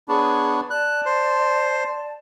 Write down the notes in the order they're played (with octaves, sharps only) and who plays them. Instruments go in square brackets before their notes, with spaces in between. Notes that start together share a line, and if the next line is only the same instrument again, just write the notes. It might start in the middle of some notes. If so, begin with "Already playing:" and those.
[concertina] B3 D4 [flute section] G#4 C#5 C#6
[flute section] D5 A5 [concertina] F#6
[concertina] C5